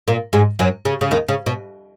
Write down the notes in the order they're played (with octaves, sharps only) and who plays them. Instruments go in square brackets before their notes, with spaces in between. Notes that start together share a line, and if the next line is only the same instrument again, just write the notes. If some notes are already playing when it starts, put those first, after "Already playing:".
[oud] A#2 A#3
G#2 G#3
F#2 F#3
C#3
C#3
D#2 D#3
C#3
B2